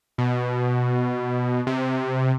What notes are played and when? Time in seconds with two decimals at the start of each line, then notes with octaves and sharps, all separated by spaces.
0.18 B2
1.67 C3